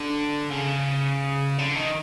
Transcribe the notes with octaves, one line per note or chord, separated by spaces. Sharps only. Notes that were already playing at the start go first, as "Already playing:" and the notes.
Already playing: D3
C#3
D3
D#3